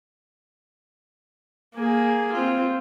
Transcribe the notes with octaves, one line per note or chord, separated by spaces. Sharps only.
A#3 G#4
C4 F4